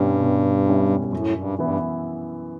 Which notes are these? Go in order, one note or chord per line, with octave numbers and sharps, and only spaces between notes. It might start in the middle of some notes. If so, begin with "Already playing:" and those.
Already playing: G2 B2 G3 C#4 E4
B2
G3 C#4 E4
E2
F#2
G2
F#2 A2
G2
G2 E3 B3 E4